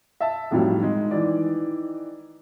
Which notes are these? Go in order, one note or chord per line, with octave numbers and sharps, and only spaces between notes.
E5 A5
F2 A2 D#3 F#3 G3
D#3 G#3
D#3 E3 D5